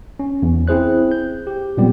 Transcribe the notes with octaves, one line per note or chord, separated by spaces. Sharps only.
C#4
E2
C4 E4 G#4 C5 F#6
G6
G4
A#2 F#3 G3 B3 C4 G4